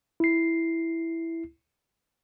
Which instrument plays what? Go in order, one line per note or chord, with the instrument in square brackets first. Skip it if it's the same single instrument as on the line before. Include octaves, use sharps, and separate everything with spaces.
[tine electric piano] E4 C7